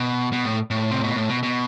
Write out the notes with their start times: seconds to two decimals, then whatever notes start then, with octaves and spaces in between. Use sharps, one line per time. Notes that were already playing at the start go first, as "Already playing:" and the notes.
Already playing: B2
0.33 B2
0.45 A2
0.71 A2
0.91 C3
1.03 B2
1.16 A2
1.29 B2
1.43 B2